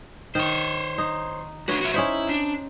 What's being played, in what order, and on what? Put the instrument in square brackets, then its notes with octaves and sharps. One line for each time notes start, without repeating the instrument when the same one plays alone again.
[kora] D#3 [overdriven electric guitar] C5 C#5
[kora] D#4
[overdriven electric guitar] D4 F#4 [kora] B4 C#5
[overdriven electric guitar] F#4 E5
[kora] C#4 D#4 C5 [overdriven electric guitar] E4
[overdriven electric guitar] D4